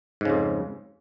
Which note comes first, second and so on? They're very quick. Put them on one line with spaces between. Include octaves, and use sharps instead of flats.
G#2 C#3 F2